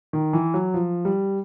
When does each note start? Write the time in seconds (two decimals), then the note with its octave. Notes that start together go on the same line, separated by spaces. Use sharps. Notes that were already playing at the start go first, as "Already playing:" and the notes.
0.13 D#3
0.33 E3
0.54 F#3
0.74 F3
1.05 G3